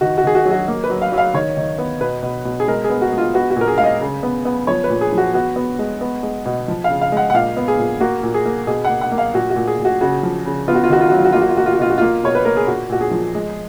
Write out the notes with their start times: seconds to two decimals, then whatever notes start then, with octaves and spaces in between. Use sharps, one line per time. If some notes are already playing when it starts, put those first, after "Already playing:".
0.01 D#3 F#4
0.18 F#4
0.24 D#3 G#4
0.35 F#4
0.45 F#3
0.51 F#4
0.68 A#3
0.84 B4
0.90 F#3
1.02 F5
1.12 F#3
1.18 F5
1.34 D#3 C#5
1.57 D#3
1.78 B3
2.01 B2 B4
2.23 B2
2.45 B2
2.60 G#4
2.68 G#3 A#4
2.84 G#4
2.90 B3
3.02 F#4
3.13 G#3
3.18 F4
3.34 B3 F#4
3.51 F#4
3.56 A#2
3.61 A#4
3.68 G#4
3.78 G#3 F5
3.84 D#5
4.01 C#3
4.23 B3
4.45 B3
4.67 F3 C#5
4.84 B4
4.90 A#2
5.01 G#4
5.12 F3
5.18 F#4
5.34 B3 F#4
5.56 B3
5.79 G#3
6.01 B3
6.23 G#3
6.45 B2
6.68 F3
6.84 F5
6.89 C#3
7.01 F5
7.12 G#3 F#5
7.30 F#5
7.34 A#2 F5
7.57 B3
7.68 G#4
7.79 A#2
8.01 A#3 F#4
8.23 A#2
8.34 G#4
8.45 A#3
8.67 B2 G#4
8.85 A#3 F#5
9.01 F#5
9.12 A#3
9.18 F5
9.34 A#2 F#4
9.50 F#4
9.56 A#2
9.67 G#4
9.79 A#2
9.85 F#4
10.01 C#3 F#4
10.23 F3
10.45 C#3
10.68 B3 F4
10.75 F#4
10.83 F4
10.89 D#3 F#4
11.01 F4
11.09 F#3 F#4
11.17 F4
11.25 F#4
11.32 A#3 F4
11.41 F#4
11.49 F4
11.56 A#3 F#4
11.66 F4
11.73 F#4
11.79 B2 F4
11.90 F#4
11.98 A#3 F4
12.24 B2 C#5
12.35 B4
12.45 A#3 A#4
12.57 G#4
12.67 A#2 F#4
12.90 A#2 F#4
13.01 G#4
13.11 F3
13.35 G#3